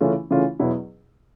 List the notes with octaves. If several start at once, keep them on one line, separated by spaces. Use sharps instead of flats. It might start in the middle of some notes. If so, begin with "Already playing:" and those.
C#3 E3 A3 C#4 F4
C#3 E3 A3 C#4 F4
E2 B2 F#3 B3 E4